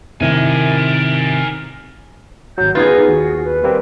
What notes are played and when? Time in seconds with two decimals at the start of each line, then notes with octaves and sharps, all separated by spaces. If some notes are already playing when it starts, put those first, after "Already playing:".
0.20 C3 D#3 E4 A#4 G#5
2.58 G#1 F#3 G6
2.75 B3 D#4 F4 G#4 B4
3.08 D#2 F#4
3.44 B4
3.64 G3 A#3 C4